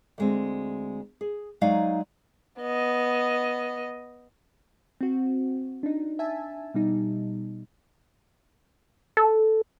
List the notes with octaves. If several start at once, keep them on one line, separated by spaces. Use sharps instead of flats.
D2 G#3 C4
G#4
F#3 G#3 D#4 C#5 D5 F5
B3 D#5
C4 F#4
D4 D#4
E5 G#5 A5
B2 G3 D#4
A4